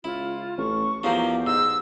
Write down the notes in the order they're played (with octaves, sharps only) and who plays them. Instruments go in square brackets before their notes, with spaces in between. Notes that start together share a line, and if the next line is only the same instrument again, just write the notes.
[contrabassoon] C#2 [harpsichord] E4 [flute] F4
[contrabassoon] A1 [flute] C#6
[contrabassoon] E2 [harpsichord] F3 F#3 A#3 [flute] G4
[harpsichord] G#2 [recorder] E6